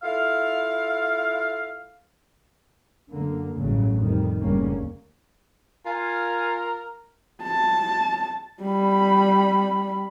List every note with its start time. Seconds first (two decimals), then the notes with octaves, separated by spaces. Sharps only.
0.02 E4 F4 A4 F5
3.12 F#2 D3 A#3
3.59 A1 D2 G2 C#3 F#3
3.99 F2 D#3 G3
4.40 F#1 D2 C#3 G3 A#3 C#4
5.86 F4 A#4 G#5
7.43 A5
8.63 G3 B5